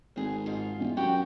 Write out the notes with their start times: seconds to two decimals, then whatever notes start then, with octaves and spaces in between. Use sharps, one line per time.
0.16 G#1 D2 G#4
0.46 G#2 F4
0.79 E1
0.97 F#2 F#4 G4 G5